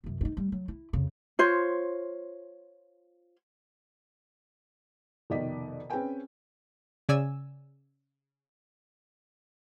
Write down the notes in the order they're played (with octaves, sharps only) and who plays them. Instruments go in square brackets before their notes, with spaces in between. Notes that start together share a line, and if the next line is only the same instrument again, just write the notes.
[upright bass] C2 F#2
G2 D#4
G3
F#3
E4
F2 C#3
[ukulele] F4 C5 C#5
[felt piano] F1 B2 D#3 D5 D#5 B6
C4 C#4 G#4 B4 G5 G#5
[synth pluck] C#3 D5 G#5 E6